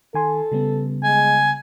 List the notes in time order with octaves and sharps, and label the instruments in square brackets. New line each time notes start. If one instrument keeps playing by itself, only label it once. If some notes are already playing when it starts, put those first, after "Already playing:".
[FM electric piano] D#3 G#5 C6 [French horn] A4
[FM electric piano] C#3 G3 B3
[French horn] G#3 [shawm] G#5